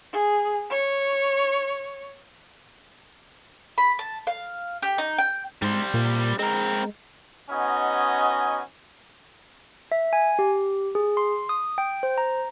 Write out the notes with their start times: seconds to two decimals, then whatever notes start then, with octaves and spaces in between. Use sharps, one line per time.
0.13 G#4
0.70 C#5
3.78 B5
3.99 A5
4.27 F5
4.82 G4
4.98 D#4
5.18 G5
5.62 G#2 G3 C5
5.94 A#2
6.39 G#3 C4 A#4
7.50 B3 C#4 D#4 F#4 D#5 G#5
9.92 E5
10.13 G#5
10.39 G4
10.95 G#4
11.17 C6
11.49 D#6
11.78 G5
12.03 C5
12.18 A#5